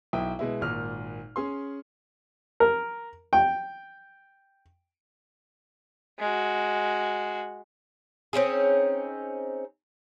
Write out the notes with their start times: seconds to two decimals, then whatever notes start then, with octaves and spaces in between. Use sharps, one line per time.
0.13 B1 E4 G5 D#6
0.39 B2 G#3 E4
0.61 G#1 A#2 F6
1.36 C#4 G#4 C6
2.60 A#4
3.33 G5
6.19 G#3 F#4
8.33 C4 C#4 D#4 G#4